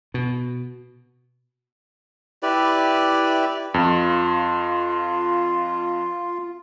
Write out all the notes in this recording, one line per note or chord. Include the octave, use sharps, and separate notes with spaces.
B2
E4 G4 B4 D5
F2 F4